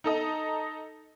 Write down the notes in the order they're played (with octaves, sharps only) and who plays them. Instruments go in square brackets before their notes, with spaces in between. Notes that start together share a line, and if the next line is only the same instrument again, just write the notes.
[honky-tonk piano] D#4 A4 D#5 A#5